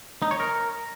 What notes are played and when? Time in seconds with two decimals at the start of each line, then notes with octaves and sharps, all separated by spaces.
0.22 D#4
0.31 C#5
0.40 A#4